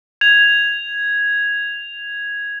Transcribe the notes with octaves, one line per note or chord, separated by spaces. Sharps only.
G#6 F7